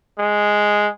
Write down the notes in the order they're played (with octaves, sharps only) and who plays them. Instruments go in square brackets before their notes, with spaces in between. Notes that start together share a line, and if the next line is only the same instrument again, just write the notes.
[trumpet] G#3